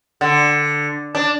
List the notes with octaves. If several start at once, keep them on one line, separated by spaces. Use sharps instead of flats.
D3
D4